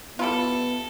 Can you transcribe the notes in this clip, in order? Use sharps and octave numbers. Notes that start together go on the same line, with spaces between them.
G3 B3 E4 F4 A4